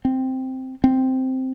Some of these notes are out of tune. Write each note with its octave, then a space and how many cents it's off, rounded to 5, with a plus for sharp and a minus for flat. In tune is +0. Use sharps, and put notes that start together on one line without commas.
C4 +0
C4 -5